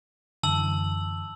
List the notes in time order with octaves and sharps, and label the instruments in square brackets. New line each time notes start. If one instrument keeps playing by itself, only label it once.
[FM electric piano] F#2 E3 [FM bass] D3 [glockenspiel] A5 E6 F#7